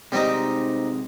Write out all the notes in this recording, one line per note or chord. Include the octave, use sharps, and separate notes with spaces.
C3 G3 G#3 C4 D#4